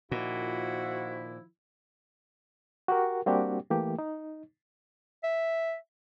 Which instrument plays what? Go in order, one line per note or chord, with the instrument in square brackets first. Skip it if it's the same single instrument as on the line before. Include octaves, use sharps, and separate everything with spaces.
[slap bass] A#2 [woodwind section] D#3 F3 E4 [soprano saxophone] F#4
[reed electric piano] F#4 G4 A#4
G3 A#3 C4 D4 F#4 G4
E3 A3 A#3 G4
D#4
[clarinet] E5